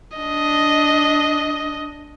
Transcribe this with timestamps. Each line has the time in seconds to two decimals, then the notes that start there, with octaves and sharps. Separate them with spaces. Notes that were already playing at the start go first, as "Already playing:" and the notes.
0.18 D4 D#5